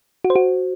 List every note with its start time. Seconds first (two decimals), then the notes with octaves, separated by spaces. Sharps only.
0.24 F#4
0.30 C5
0.36 F#4